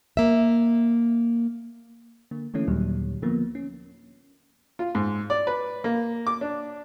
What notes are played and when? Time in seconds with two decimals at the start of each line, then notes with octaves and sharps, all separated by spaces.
0.17 A#3 E5
2.31 D3 A#3
2.54 D3 E3 A3 A#3 C#4 E4
2.67 D#2 A#2 D3 D#3 F#3 G3
3.22 D3 F3 A#3 B3
3.55 C#4
4.79 F4
4.95 G#2
5.30 D5
5.47 B4
5.84 A#3
6.27 D6
6.41 D4